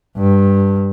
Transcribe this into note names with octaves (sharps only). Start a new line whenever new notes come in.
G2